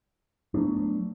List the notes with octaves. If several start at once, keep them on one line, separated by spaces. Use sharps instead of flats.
F#3 A3 B3 D4